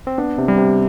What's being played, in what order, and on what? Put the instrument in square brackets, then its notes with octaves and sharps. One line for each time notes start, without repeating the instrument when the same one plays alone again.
[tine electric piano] C4
[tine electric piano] B3 [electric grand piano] D4
[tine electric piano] C3
[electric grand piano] G3
[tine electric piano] C3